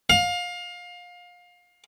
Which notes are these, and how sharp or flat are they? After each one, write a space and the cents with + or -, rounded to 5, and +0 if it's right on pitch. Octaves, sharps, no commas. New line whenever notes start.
F5 +25